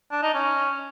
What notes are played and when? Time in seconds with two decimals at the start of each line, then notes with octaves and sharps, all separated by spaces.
0.11 D4
0.23 D#4
0.34 C#4